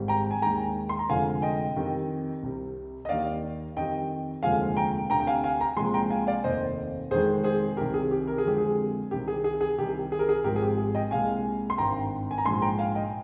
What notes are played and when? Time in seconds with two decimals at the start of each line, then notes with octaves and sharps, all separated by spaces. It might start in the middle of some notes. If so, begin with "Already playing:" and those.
Already playing: G#1 G#2 D#3 G3
0.08 G5 A#5
0.31 G#5
0.42 D#2 D#3 G#3 G5 A#5
0.89 C6
0.99 A#5
1.09 F1 F2 D3 F3 G#3 F5 G#5
1.42 D#5 G5
1.76 F2 D#3 G3
2.43 C2 C3 G3
3.05 D#5
3.09 D#2 D#3 G3 D5 F5
3.77 F2 D#3 G3 D#5 G5
4.43 F1 D#2 D3 F3 G#3 F5 G#5
4.77 G5 A#5
5.10 D2 C3 G3 G5 A#5
5.20 G5
5.27 F5 G#5
5.44 F5 G#5
5.60 G5 A#5
5.77 C2 A#2 F3 G#3 G#5 C6
5.94 G5 A#5
6.10 F5 G#5
6.27 D5 F5
6.44 F1 D#2 D#3 C5 D#5
7.11 F1 F2 D#3 G#3 G#4 C5
7.43 G#4 C5
7.77 C2 C3 D#3 G3 G4 A#4
7.94 G#4
8.11 G4
8.27 A#4
8.38 G#4
8.44 F2 D3 F3 G#3 G4
8.58 G#4
9.11 C2 C3 D#3 G3 G4
9.28 G#4
9.44 G#4
9.61 G#4
9.78 C2 C3 D#3 G3 G4
10.12 G#4
10.19 A#4
10.29 G#4
10.44 G#1 G#2 F3 G#3 G4 A#4
10.56 G#4
10.62 G4
10.78 G#4
10.95 D#5 G5
11.11 C2 A#2 G#3 F5 G#5
11.70 C6
11.78 G#1 G2 D#3 G5 A#5
12.31 G#5
12.38 A#5
12.45 A#1 G#2 F3 G#3 G#5 C6
12.62 G5 A#5
12.78 F5 G#5
12.95 D#5 G5